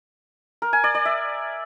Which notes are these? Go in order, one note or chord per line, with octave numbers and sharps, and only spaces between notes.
A#4
G#5
D5
D5
E5